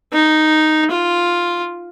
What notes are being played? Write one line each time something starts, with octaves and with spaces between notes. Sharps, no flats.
D#4
F4